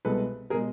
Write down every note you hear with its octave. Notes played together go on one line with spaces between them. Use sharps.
C2 B2 G#3 A4 B4
B2 G#3 G#4 A#4